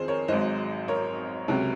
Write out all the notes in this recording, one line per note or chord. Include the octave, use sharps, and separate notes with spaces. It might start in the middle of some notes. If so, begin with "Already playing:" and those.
Already playing: F2 D#3 G#4 C5
A#4 C#5
G#1 G#2 F#3 C5 D#5
A#4 C#5
C#2 C3 F#3